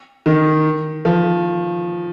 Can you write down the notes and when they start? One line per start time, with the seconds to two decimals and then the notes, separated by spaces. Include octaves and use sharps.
0.26 D#3
1.05 F3